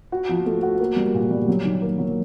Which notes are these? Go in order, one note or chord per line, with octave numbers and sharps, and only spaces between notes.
F#4
F3
A3
F#4
A#3
G3
A#2
G3
F#3
D#3
A#3
F#3